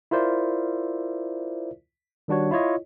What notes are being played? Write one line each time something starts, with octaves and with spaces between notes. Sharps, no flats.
E4 F4 A#4 C5 D5 E5
D#3 G3 D4 F#4 C#5
E4 F4 C#5 D#5